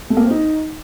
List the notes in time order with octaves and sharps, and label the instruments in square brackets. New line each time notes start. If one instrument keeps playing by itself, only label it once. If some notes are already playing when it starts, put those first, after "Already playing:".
[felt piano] A3
A#3
C4
D#4